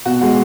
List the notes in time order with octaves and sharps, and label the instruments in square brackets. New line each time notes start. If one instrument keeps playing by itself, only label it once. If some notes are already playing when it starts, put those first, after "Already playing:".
[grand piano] B2 [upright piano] F#4
[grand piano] G#3 [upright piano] F#4